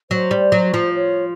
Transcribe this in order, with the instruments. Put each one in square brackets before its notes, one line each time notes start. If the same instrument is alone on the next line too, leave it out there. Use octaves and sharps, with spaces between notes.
[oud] F#3 [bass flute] C5
[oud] G3
F#3
F3
[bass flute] C#5